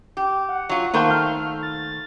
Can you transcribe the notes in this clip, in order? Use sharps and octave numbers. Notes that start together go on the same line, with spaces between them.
G4
F#5
F#3 F4
D#3 A3 A#3 C5
F6
A6